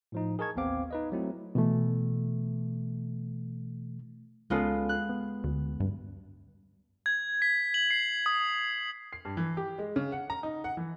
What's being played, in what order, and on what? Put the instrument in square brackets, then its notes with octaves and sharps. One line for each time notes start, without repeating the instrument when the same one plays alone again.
[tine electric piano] A2 F3 D#4
G#4 A#4 D#5 A5 C#6 G#6
A1 D#2 B3 C4 F5 D6
D#4 B4 D#5
F#3 A3 C4 E4
[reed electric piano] B2 E3 A3
[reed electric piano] C#2 C#4 A4 [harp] G#3 B3 F4
[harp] F#6
[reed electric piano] B3
[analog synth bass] D2
G2
[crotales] G#6
B6
F#7
C7
D#6
[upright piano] C7
G2
E3
G4
G#3
C#3
F#5
A#5
D#4
F#5
E3